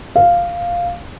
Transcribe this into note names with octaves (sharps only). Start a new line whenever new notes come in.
F5